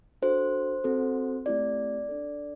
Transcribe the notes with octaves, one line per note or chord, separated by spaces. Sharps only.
D4 F#4 A4 C5
C4 F#4 A4
A3 C4 E4 G4 D5
D4 A4